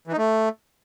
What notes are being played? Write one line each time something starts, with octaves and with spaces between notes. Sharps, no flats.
E3
D#4
A3